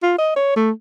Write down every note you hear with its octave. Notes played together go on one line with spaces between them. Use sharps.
F4
D#5
C#5
A3